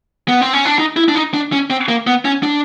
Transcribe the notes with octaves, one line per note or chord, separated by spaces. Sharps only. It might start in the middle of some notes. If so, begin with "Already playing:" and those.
B3
C4
C#4
D4
D#4
E4
D4
D#4
D4
C#4
C4
A#3
B3
C#4
D4